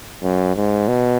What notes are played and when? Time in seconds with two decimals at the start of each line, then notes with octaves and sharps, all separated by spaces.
0.23 F#2
0.56 G#2
0.88 B2